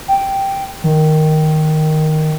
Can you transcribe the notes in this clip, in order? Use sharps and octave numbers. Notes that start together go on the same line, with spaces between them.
G5
D#3